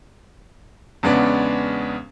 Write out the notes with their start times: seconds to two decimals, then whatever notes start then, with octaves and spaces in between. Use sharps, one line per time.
1.03 E2 C#3 G#3 B3 C#4 D4